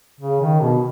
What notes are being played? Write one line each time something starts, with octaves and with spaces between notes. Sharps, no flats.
C#3
D#3
B2